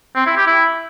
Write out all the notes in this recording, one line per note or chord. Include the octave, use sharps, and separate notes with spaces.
C4
E4
G4
E4